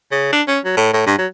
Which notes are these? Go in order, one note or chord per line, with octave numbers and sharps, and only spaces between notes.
C#3
D4
C#4
F#3
A2
A2
G2
F#3